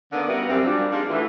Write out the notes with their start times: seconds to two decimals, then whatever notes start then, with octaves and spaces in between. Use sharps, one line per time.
0.12 D3 D#3 A#3 B3 C#4 D5
0.28 G3 B3 F#4 A#4 E5 F5
0.49 F#2 G3 C4
0.65 F3 G3 D4
0.91 A#3 D4 D#4 F4 G4 G#4
1.09 D2 E3